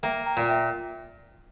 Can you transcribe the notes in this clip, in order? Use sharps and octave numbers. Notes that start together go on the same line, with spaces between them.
A#3 E5 G5
G5 A#5
A#2
E5 G5